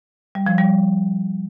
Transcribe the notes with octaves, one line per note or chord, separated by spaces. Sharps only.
G3
F3
G3